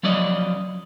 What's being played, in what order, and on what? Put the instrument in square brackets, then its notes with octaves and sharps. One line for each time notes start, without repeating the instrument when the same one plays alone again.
[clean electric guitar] F3 F#3 C#4 D5 D#5